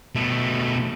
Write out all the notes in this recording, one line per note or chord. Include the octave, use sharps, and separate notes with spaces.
B2 A3